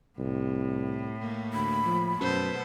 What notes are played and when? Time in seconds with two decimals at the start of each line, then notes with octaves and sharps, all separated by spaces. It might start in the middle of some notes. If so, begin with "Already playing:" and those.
0.19 C2 A2
1.21 A3 A#3
1.53 D2 B5
1.86 F3
2.20 F#2 B2 A4 B4 C5